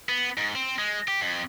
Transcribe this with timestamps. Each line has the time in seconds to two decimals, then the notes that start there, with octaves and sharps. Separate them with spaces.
0.09 B3
0.38 G#2
0.55 C4
0.79 G#3
1.08 G4
1.21 F2